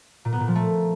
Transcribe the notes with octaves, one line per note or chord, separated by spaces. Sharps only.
A#2
B3
A#2
F3
A3